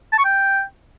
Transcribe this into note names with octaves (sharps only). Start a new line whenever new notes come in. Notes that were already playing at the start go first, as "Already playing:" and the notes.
A5
C#6
G5